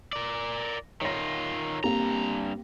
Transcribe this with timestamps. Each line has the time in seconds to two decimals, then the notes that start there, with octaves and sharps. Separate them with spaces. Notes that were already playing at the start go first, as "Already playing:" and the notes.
0.13 A#4 D5
1.01 D#3 F4 C#5 A#6
1.84 G2 A#3 C4 G4 A#5